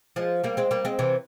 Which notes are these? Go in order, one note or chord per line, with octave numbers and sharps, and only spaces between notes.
F3 G#3
G3 A#3
G#3 C4
G3 A#3
G#3 C4
C3 E3